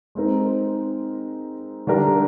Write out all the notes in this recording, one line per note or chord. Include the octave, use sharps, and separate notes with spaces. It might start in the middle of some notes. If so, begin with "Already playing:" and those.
G#3 C4 D#4 A#4
D3 G3 D4 G4 A#4